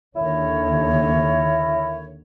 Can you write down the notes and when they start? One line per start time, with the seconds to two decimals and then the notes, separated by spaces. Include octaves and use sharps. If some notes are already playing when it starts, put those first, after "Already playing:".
0.15 D#2 D3 D#3 E4 A#4 C#5